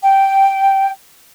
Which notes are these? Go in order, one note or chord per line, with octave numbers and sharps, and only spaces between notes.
G5